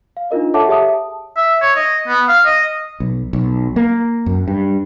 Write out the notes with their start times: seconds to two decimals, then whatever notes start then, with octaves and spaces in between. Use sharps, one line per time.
0.17 F5
0.31 D4 D#4 F4 A#4 D#5
0.54 A4 C#5 E5 F#5 A5 D6
0.68 G4 G#4 C#5 E5 A5 D#6
0.89 A5
1.37 E5
1.62 C#5
1.76 D#5
2.08 B3
2.28 F5
2.45 D#5
3.00 B1
3.33 B1
3.76 A#3
4.26 F#2
4.48 G2